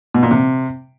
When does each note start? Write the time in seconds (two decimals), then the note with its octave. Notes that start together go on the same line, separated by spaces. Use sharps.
0.14 B2
0.23 A#2
0.31 C3